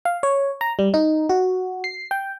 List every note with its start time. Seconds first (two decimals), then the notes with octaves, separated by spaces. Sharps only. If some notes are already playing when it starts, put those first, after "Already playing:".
0.05 F5
0.23 C#5
0.61 A#5
0.79 G3
0.94 D#4
1.29 F#4
1.84 C7
2.11 G5